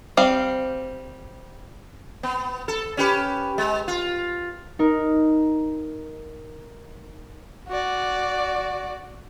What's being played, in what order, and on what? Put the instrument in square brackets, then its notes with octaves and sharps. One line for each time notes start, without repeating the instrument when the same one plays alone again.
[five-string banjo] G3 C4 F5
[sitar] B3
A4
C#4 G4 B4
G#3
F4
[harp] D#4 A#4
[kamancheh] F#4 D5